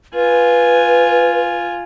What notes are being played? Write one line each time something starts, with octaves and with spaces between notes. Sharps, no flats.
F4 B4 G#5